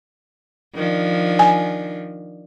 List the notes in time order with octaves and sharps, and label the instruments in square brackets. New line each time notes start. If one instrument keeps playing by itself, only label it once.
[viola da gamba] D#3 F3 D4
[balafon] G#5